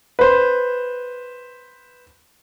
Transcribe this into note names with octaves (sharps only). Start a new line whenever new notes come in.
B4 C5